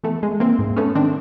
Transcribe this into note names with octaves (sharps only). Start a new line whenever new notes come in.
E3 A3 B3
G#3
E3 A#3 C4
G#2
A3 B3 C#4
D#3 C4 D4